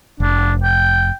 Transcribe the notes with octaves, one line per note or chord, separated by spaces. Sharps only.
F1 D4
G5